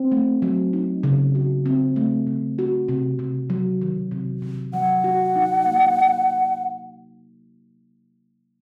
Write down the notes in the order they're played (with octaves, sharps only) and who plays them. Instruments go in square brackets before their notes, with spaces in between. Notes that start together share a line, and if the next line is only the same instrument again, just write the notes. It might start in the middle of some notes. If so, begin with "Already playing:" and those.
Already playing: [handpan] C4
A3
F#3
D#4
C#3
F#4
C4
A3
C#3
F#4
C3
C3
F#3
D#3
C3
C3
[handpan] F#3 [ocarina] F#5
[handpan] F#4
D#4
A#3